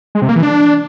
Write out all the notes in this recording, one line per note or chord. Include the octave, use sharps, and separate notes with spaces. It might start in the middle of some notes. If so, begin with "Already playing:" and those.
G#3
C3
A#3
E3
D4